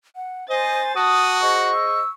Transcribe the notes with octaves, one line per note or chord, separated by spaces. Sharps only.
F#5
C5 D#5 G#5 A6
F#4 A5 D#6
G#4 C5 D#5 C#6
E6